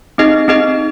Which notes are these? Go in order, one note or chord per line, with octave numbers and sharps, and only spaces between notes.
C4 D#4 G#4 D#5
C4 D#4 G#4 D#5